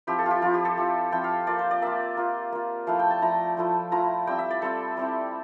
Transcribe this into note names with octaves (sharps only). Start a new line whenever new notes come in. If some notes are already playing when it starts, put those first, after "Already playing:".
F3 C4 E4 G4
A4
F4
G4
F3 C4 E4 F4
G4
A4
F3 C4 E4
F3 C4 E4 G5
F5
A#3 F4 D5
C5
D5
A#3 F4 E5
A#3 F4
A#3 F4
F3 A3 E4 F5
G5
A5
F3 A3 E4 A#5
F3 A3 E4
F3 A3 E4 A#5
G3 C4 E4 G5
E5
D5
G3 C4 E4 A4
G3 C4 E4